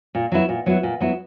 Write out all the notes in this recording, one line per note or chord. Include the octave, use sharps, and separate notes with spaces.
A#2
F#3 B3 E4
A#2
F#3 B3 E4
A#2
F#3 B3 E4